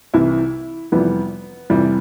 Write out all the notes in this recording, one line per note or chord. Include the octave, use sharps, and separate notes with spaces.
C2 C3 E3 E4
F1 F2 C3 E3 G3 B3
F1 F2 C3 E3 G3